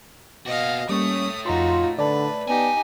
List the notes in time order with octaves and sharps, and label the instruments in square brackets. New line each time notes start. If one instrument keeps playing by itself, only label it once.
[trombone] B2 [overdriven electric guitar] A#3 F#4 [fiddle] D#5 F5
[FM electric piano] G3 A#3 C#6 [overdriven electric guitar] A3 C#5 [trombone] C#4 [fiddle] D#6
[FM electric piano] F2 A#5 C6 [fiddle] D#4 F#4 [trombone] F4
[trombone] D3 [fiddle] B4 [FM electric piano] D5 A5
[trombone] B3 [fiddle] D#4 G4 [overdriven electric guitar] G#5